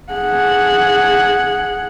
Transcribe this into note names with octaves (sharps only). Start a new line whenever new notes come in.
G#4 F#5